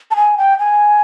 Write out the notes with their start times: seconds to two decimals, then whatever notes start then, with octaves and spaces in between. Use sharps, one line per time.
0.11 A5
0.16 G#5
0.38 G5
0.59 G#5